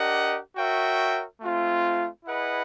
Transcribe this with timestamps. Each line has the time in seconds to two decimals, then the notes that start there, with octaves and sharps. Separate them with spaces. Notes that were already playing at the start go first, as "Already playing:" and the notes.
Already playing: D4 G4 A#4 D#5 F#5
0.56 F#4 A#4 C#5 E5 G5
1.41 A3 C4 F4
2.25 E4 G#4 B4 D#5 F#5